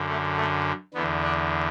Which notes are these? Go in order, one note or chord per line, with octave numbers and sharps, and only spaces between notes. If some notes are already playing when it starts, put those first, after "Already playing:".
Already playing: F#2 D3
A3
A3
E2 D3 B3
D4